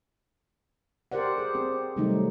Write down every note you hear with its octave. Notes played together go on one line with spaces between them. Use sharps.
G4 A#4 C5 D5 F#5
G#4
C4
C3 D#3 F#3 G3 A3 D#4